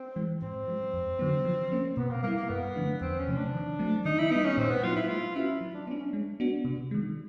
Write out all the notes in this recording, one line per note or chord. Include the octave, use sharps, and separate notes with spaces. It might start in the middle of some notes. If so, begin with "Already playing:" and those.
Already playing: C4
E3 G#3
G#2 C4
F3 G#3
F2
D3 F#3 B3
F3
A#3 C#4
B2 B3
A#3
G3 A#3 B3 E4
A#3
G2 B3
D3 F3 A3 D4
E2 C4
C#4
C3 F3 A3 C4
D4
D#3
F#3 A3 C4
D#3 D#4
E4
G3 B3 D#4
C#4
A#2 C4
B3
F#3 A#3 D#4 F4
E4
G#3 F4
C#4 E4 F#4 B4
F#3
D4
B3 C#4 D4
C#4
G#3
B3 D4 F#4
C3
D#3 G#3